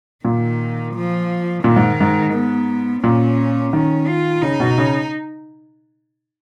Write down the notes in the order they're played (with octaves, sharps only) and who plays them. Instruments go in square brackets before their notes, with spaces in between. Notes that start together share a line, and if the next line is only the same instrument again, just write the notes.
[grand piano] A#2 [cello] D#3
[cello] F3
[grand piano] A#2 [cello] D#3
[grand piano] G#2
G#2
[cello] B3
[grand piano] A#2 [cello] C#4
[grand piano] D#3 [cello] C#4
[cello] F4
[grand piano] C#3 [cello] D#4
[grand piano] B2
C#3